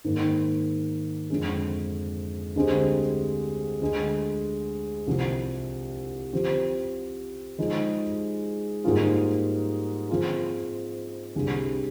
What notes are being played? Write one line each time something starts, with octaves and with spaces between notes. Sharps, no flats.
G#2 D#3 A#3
F2 D3 G#3
D2 D3 G#3 C4 G4
D2 D3 G#3
C2 C3 F3
F3 C4 G4
F3 G#3 D#4 G#4
G#2 G3 A#3 F4 G#4
F3 C4 F4 G#4
C2 C3 G3 D4 G#4